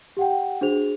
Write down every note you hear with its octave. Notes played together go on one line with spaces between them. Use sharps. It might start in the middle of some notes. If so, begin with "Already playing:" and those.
G4 F#5 G5
D4 F#4 G#4 C5 F7